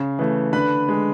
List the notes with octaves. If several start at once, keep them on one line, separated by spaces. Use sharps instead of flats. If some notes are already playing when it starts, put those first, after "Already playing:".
Already playing: C#3
E3 A3
D3 B4 B5
G#3